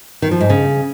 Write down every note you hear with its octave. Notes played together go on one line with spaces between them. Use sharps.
D#3
F3
G#2
C#3